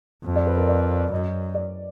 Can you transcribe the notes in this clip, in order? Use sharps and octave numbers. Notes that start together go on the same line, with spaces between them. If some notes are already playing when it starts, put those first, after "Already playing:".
F2
D5
B4
A#4
D5
F#2 D#5
D5